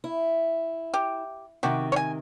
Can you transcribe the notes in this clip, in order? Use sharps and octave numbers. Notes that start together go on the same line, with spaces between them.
E4
G4
C3 D#3 F#4 G4
C#5 G#5